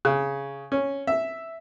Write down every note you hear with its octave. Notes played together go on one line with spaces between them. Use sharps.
C#3
C#4
E5